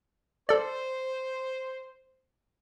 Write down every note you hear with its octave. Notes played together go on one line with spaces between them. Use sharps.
A4 C5 D5